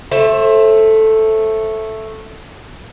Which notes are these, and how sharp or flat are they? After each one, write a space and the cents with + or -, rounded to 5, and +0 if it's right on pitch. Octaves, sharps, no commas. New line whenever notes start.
A3 +0 C5 +30 E5 +0